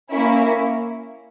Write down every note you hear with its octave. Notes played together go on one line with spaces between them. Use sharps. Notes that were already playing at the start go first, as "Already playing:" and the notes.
A#3 C#4 E4